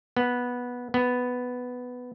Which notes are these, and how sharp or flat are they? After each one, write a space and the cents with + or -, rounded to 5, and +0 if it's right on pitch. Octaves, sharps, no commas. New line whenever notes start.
B3 -10
B3 +5